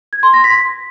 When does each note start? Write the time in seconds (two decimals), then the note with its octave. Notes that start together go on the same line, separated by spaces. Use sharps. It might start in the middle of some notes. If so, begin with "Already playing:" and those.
0.13 G#6
0.23 C6
0.33 A#6
0.44 B6